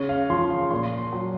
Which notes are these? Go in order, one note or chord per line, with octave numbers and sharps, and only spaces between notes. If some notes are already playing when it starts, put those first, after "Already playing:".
Already playing: C#3 C#5
F5
F3 C6
F5
A#2 C6
F#3